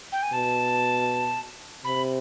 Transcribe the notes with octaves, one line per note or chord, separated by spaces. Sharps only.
G5
G#5
B2 A5
C3 B5